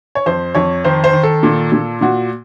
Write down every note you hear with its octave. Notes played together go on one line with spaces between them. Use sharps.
C#5
F2 C5
F2 C#5
D#3 C5
C5
D#3
A4
A#2
A#2
A#2 F#4